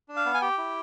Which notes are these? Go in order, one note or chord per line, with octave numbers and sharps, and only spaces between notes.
D4
F5
B3
G#5
G4 G5
E4